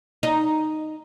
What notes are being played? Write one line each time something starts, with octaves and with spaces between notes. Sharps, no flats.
D#4